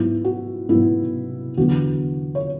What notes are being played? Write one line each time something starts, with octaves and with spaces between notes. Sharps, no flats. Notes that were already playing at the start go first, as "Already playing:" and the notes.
Already playing: G#2 F#3 B3 E4
F#4
G#2 F#3 B3 E4
E2 D3 F#3 B3 F#4
C#5